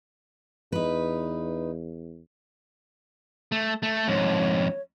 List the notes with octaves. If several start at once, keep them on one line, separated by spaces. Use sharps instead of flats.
E2 D#4 B4
A3
A3
F2 G#2 C#5